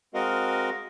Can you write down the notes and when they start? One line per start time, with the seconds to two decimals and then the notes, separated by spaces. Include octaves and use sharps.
0.14 G#3 C4 F#4 A#4 D#5 F5